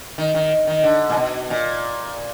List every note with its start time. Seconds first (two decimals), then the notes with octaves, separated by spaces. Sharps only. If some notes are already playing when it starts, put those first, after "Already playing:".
0.18 D#3
0.34 D#3
0.67 D#3
0.83 D3
1.10 A#2
1.17 B2
1.50 A#2